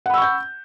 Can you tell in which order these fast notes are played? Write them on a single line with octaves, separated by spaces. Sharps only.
F#5 B5 E6 C#6 G6